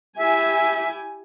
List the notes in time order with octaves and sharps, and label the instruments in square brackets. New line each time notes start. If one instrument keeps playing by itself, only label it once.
[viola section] E4 G4 G#5 [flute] E5